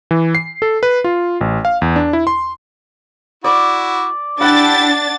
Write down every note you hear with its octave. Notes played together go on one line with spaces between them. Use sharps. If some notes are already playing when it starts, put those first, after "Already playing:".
E3
C7
A4
B4
F4
A1
F5
E2
D4
E4
C6
E4 F#4 D5
D4 E4 G4 F#5 A6